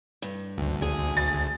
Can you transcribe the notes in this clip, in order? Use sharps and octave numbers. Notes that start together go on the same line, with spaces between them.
G2
D2
G#4
A6